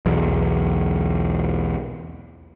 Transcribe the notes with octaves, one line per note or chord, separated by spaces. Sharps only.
B1 E2